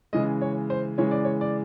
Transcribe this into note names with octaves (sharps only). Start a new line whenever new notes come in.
C#3 E3 G#3 D#5
C#5
C5
C#3 E3 G#3 C#5
D5
C#5
D5